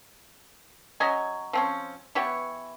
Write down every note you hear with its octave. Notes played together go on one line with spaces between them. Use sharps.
F#3 C#4 D#5 G#5
F3 C4 C#4
E3 B3 G4 C#5